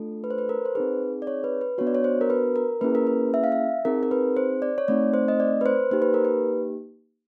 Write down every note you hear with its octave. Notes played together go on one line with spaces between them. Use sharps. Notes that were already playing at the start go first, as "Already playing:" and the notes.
Already playing: A3 D4 F4 A4
B4
C5
B4
A#4
C5
C4 D#4 G#4 B4
D5
C#5
B4
B4
B3 D4 F#4 C#5
D5
C#5
C5
A#4
B4
A#4
A#3 C#4 E4 G#4 B4
A#4
B4
E5
F5
E5
C4 D#4 G#4 A#4
A#4
B4
C5
D5
C#5
A3 C4 D#4 D5
C5
D#5
D5
B4
C5
A#3 D#4 G4 C5
B4
A#4
B4